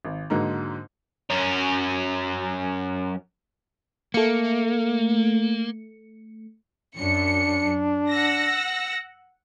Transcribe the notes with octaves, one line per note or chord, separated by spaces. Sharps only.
G#1
G#2 D3 F#3 G#3 A#3 D#4
F#2 C#4
A3 A#3 C#7
F#2 D4 C#7
F#5 E6 A#6